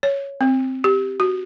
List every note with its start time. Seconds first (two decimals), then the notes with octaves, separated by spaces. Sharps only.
0.03 C#5
0.41 C4
0.84 G4
1.20 F#4